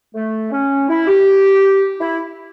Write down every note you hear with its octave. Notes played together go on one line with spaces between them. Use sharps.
A3
C#4
E4
G4
E4